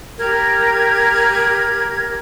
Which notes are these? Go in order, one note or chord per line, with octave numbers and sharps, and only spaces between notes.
G4 A#4 G#6